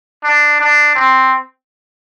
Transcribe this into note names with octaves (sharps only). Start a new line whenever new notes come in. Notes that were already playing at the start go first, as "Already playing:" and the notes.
D4
D4
C4